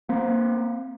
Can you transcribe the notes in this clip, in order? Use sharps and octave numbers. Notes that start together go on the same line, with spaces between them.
A#3 C4